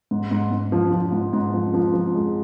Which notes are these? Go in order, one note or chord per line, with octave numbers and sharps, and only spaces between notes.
G#2
G#2
G#2
F3
F3
G#2
G#2
F3
F3
F3
G#3